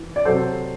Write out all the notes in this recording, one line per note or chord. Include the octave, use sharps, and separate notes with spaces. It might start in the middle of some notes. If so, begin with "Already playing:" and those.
Already playing: E3
D5
C3 F#3 A4 C5